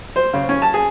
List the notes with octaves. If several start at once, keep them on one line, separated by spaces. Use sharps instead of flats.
C5
C#3
C#4
A5
G#4